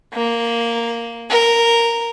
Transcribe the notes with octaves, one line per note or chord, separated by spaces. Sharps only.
A#3
A#4